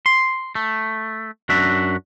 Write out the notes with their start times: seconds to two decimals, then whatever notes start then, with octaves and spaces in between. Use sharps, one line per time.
0.06 C6
0.55 A3
1.49 F#2 D4 F#4 E5